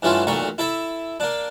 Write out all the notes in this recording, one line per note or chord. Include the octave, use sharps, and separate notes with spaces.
G2 D3 E3 A3 C#4 F4
B1 E2 A#2 A3 A#5 C#6
E4 A4 E5
A#3 D4